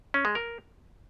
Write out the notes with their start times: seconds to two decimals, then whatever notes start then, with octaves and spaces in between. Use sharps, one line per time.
0.14 C#4
0.25 G#3
0.35 A#4